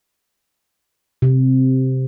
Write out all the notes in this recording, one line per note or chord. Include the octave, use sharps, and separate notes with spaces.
C3